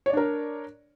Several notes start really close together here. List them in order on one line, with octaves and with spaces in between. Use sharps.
C#5 D5 D4 A#4